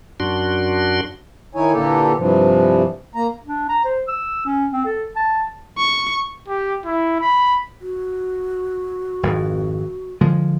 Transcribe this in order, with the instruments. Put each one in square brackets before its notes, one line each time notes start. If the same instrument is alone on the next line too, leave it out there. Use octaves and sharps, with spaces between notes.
[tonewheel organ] F#2 D4 F#4 C6
[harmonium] D#3 D#4 E4 C#5 G#5
A#2 D3 E3 A#3 G4 A4
G2 C3 E3 F3
A#3 A#5
[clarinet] D4
A#5
C5
E6
C#4
C4
A4
A5
[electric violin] C#6
[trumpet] G4
E4
B5
[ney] F#4
[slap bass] G#1 F2
D3 F3 G#3